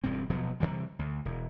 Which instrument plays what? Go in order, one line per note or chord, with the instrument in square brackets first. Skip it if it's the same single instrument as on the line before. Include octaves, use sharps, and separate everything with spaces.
[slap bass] E1 G2 G3 C4
D#1 B2 F3 F#3
C3 D#3 E3 G3
D2
E1